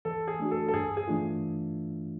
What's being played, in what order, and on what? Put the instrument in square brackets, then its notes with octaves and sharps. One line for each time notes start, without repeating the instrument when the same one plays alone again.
[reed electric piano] E3 [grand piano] A4
[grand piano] G#4
[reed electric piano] A3 D4 F#4
[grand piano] A4
A4
[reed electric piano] G2 [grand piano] G#4
[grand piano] G#4
[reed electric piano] E3 A3 D4 F4